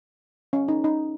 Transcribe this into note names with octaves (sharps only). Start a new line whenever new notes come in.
C#4
D#4
D#4